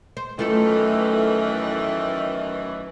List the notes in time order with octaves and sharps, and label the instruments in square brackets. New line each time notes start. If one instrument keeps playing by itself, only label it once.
[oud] C5
[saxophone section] F#2 D#3 E3 [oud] A3 F4 A4